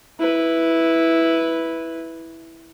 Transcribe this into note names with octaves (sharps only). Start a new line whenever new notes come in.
E4 B4